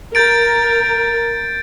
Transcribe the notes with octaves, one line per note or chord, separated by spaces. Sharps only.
A#4 G6 A6 D7